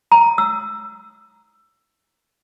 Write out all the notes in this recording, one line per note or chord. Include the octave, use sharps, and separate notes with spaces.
A#5
E6